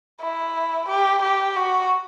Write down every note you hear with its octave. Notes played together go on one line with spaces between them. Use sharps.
E4
G4
G4
F#4